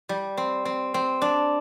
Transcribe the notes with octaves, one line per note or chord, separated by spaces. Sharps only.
G3
C4
C4
C4
D4